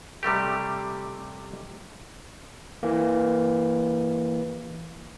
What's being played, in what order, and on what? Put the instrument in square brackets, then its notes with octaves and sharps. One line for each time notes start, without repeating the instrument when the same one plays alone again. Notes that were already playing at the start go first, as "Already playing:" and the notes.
[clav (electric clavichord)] C3 G3 A3 G4
[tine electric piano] E3 A#3